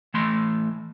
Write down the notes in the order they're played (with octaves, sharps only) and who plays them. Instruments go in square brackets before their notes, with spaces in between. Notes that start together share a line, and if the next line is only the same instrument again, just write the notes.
[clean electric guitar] E3 A3 C6